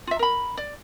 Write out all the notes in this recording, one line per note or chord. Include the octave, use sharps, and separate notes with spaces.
F4 E5
A#4 B5
D5